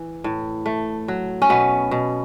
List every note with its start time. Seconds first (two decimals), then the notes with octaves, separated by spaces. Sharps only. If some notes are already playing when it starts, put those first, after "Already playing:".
Already playing: E3
0.24 A2
0.66 A3
1.08 F#3
1.42 C#4
1.49 B2 B3
1.91 B2